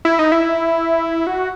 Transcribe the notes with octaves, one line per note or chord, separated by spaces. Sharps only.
E4
D#4
E4
F#4